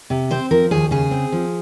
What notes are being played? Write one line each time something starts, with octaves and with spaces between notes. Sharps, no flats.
C3
C4 C5
F3 A#4
D#2 G#4
C#3 G#4
C4
F3